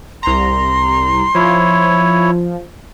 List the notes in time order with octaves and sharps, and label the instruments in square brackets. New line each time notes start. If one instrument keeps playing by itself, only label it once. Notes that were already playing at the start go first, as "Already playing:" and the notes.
[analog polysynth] C2 A#5 [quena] C6
[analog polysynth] F3 [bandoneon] E4 C#5